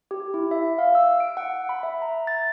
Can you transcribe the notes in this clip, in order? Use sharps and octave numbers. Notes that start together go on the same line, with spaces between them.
G4
E4
E5
F5
E6
D7
F#5
B5
E5
A#5
A6